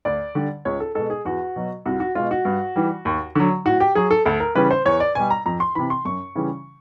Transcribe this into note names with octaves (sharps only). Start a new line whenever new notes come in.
D2 D5
D3 G3
C#2 C#5
A4
B2 G#3 A4
G#4
E2 F#4
B2 F#3
C2 F#4
F#4
B2 G#3 F4
F#4
G2
E3 G3
D#2
D3 F#3
A2 F#4
G4
F#3 G#4
A4
D2 A4
A#4
C#3 E3 G3 B4
C5
E2 C#5
D5
B2 G3 G#5
A#5
F2 A#5
C6
C3 E3 B5
C6
F#2 C#6
C#3 E3 G3